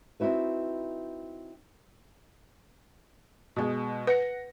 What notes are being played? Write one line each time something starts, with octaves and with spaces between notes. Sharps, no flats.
C4 D#4 E4 F#4 B4
B2 G#3
B4 F#5 A#6 C#7